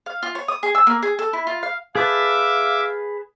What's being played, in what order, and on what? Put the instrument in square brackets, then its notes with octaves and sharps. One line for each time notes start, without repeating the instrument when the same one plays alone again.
[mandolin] F5
F4
C#5
D#6
G#4
E6
A#3
G#4
A4
E4
F4
F5
[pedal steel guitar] G#4 B4 A5 [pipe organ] E5 D6 [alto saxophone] F5